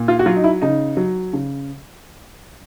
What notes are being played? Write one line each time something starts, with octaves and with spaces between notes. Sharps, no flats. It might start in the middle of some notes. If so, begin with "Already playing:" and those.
Already playing: A#2
F4
F#4
F#3 F4
D#4
E4
C#3 D#4
F#3
C#3